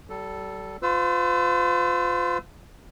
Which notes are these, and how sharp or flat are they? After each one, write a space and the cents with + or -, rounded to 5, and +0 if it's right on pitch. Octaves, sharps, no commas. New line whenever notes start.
G3 -35 A4 +0
F4 +20 C5 -45 E6 +0